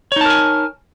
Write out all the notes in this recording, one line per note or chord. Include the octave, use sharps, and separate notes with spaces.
D#4 A#4 C#5 G#5 A5